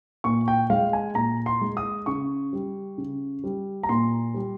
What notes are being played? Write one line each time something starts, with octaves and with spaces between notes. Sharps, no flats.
A#2 C#6
G5
G#3 F5
G#5
A#2 A#5
C6
G#3
D#6
C#3 C#6
G3
C#3
G3
A#5
A#2 C6
G3